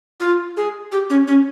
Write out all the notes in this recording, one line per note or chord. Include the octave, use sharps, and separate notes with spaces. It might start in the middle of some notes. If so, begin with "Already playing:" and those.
F4
G#4
G4
C#4
C#4